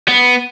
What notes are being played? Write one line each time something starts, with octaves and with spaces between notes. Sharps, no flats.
B3